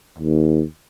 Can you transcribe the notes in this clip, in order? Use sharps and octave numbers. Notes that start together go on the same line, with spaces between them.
D#2